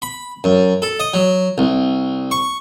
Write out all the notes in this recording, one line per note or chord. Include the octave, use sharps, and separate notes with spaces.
B5
F#2
A4
D#5
F#3
C2
C#6